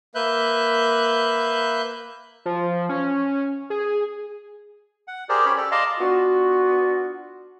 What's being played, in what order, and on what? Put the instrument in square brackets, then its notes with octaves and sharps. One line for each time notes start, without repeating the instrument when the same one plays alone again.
[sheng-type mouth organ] A#3 B4 E5 F#6 G6
[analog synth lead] F3
C#4
G#4
[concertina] F#5
G4 G#4 A#4 C5 D5
C#4 C#5 B5
G4 A4 D5
D5 D#5 F5 A5 A#5 C6
[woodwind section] B3 D4 F4 F#4